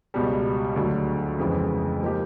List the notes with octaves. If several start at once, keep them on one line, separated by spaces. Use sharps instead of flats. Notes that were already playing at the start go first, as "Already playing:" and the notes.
C#2 B2 G3
D2 D3 F#3
F2 C#3 E3 G#3 B3
F3 A#3 D#4 G4